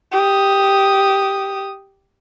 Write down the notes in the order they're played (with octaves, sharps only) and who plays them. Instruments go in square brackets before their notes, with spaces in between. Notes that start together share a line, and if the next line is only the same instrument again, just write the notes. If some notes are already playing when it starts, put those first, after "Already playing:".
[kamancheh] G4 D#6